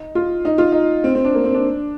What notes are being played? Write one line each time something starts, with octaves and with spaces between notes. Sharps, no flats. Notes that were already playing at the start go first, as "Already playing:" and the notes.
Already playing: D#4
F4
D#4
F4
D#4
C4
C4
D4
A#3
C4
D4